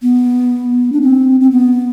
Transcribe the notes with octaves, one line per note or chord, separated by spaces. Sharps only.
B3
D4
C4
C4
B3